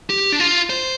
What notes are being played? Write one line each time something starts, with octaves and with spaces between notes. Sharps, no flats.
G4
D4
F4
C5